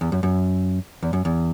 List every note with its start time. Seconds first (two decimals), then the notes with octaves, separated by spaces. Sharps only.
0.01 E2
0.12 F#2
0.23 F#2
1.03 E2
1.13 F#2
1.25 E2